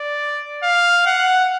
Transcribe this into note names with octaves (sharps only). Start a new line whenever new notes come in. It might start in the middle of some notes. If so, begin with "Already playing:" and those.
Already playing: D5
F5
F#5